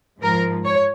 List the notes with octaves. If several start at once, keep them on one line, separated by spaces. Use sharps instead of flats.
G#2 F3 A#4
C#5